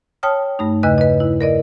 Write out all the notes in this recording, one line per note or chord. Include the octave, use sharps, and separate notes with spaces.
C#5 G5 A5 D#6 F6
G2 A3 D#4
E2 C#3 B4 D#5 F#6
B4 D#5
E4
A#4 D5 D#5